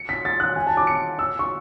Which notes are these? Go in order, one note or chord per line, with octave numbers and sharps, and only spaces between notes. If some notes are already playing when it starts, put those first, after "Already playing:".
Already playing: C#7
B6
A6
F#6
G#5
A5
D6
C#7
E6
C#6